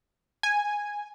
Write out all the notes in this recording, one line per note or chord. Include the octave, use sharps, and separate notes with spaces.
G#5